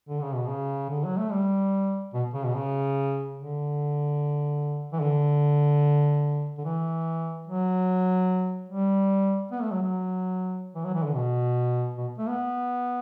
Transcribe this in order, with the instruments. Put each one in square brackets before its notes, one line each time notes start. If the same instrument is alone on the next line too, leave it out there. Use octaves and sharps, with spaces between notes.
[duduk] D3
C#3
B2
C#3
D3
F#3
A3
G3
B2
C#3
B2
C#3
D3
E3
D3
D3
E3
F#3
G3
B3
A3
F#3
F#3
E3
F#3
E3
D3
B2
B2
A3
B3